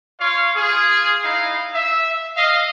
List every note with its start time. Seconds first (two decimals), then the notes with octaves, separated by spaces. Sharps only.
0.19 F4 C#5 F5
0.55 F4 G#4
1.23 D#4 E4 F5
1.73 E5
2.36 D#5 F5